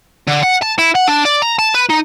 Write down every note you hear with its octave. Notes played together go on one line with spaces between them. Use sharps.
D3
F#5
A5
E4
F#5
D4
D5
A#5
A5
B4
D#4